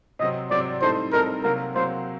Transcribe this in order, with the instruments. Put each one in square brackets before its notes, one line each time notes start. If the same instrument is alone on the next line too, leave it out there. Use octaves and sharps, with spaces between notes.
[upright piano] C3 F#3 C4 [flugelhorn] D#5
[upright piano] C3 F#3 C4 [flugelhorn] D5
[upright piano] A2 G3 C4 D#4 A4 [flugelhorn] C5
[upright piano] A2 G3 C4 D#4 A4 [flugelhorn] A#4
[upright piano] C3 F#3 A#3 F#4 [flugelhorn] A#4
[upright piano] C3 F#3 A#3 F#4 [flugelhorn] C5